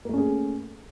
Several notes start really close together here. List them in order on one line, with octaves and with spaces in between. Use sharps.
A#3 A3 C#4 G#4